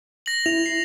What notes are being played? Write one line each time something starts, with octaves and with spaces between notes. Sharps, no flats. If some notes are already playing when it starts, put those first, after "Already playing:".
A#6 F#7
E4 F7
C7